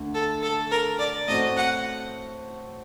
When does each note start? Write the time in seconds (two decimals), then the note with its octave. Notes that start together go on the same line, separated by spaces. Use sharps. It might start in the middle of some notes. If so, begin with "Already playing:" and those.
Already playing: D2 D3
0.14 A4
0.42 A4
0.71 A#4
0.99 D5
1.28 A2 A3 C4 F#4 D#5
1.57 F#5